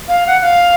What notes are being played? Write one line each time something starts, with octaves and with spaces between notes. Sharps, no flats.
F5
F#5
F#5
F5